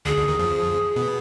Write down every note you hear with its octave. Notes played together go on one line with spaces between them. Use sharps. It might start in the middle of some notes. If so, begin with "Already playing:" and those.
D2 D3 G#4
D2 D3
D#2 D#3
F2 F3
B2 B3